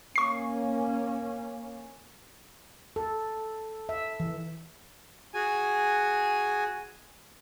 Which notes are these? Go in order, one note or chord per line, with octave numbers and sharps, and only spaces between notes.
A#3 C#4 C#6 C7
A4
E5
E3
F#4 G#4 G#5